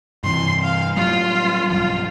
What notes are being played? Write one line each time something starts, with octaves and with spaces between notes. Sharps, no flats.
G2 C3 E3 C6
F5
A2 F#3 G3 F4
B1 G2 F3 F4